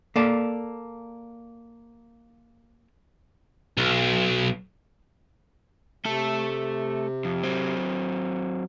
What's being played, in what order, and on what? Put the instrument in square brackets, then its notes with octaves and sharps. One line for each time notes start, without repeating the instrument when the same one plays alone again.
[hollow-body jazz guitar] A#3 A4 D5
[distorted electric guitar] B1
[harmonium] C3 [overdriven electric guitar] A3 A4
[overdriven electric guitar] F2
F#3 C4